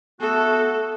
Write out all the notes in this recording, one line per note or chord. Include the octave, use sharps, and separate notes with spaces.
A3 B3 F#4 A4